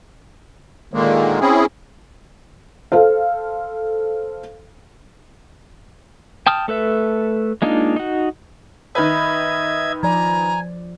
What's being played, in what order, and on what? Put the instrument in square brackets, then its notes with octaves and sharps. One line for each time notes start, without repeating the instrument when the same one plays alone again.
[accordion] A#2 D3 D#3 G#3 A#3
C4 C#4 E4 G#4
[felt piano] A4 C5 F5
[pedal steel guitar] G5 A5 D#6 F6
A3 A4 B4 E5
G#3 A#3 D4 D#4 F4
D#4 F#4
[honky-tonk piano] D#3 B4 [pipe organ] D#5 E5 G#6
[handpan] F3 D5 [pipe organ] G#5 [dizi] A#5